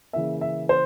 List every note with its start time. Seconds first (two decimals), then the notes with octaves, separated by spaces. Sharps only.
0.13 C#3 E3 A#3 E5
0.41 E5
0.69 C5